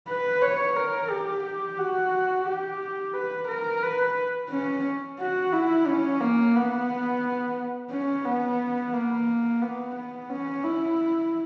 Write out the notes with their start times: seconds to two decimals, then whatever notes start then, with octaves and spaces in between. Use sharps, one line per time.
0.08 B4
0.42 C#5
0.76 A#4
1.11 G4
1.45 G4
1.78 F#4
2.47 G4
3.14 B4
3.48 A#4
3.83 B4
4.50 C#4
5.20 F#4
5.53 E4
5.87 C#4
6.21 A#3
6.55 B3
7.91 C#4
8.25 B3
8.93 A#3
9.62 B3
9.96 B3
10.30 C#4
10.64 E4